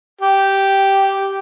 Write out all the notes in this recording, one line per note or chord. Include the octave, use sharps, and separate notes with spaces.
G4